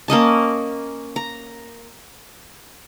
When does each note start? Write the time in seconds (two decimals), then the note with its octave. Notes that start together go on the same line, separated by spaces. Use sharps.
0.08 A#3 C#4 D#5 A5
1.16 A#5